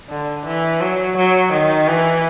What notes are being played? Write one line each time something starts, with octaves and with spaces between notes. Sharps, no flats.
D3
E3
F#3
F#3
D#3
E3